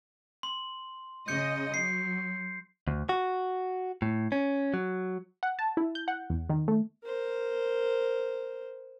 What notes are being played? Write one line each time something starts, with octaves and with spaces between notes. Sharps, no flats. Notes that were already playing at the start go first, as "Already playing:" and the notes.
C6
C#3 D#5 G6 C#7
F#3 C7
D2
F#4
A2
C#4
F#3
F#5
A5
E4
G6
F#5
E2
D#3
A3
A#4 C5